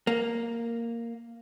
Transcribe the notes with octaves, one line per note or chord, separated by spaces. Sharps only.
A#3